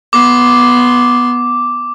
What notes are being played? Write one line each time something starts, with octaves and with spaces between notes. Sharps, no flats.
B3 C6 D6